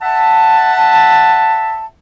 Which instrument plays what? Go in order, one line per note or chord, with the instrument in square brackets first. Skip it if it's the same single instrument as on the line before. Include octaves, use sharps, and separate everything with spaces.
[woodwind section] E5 F#5 A5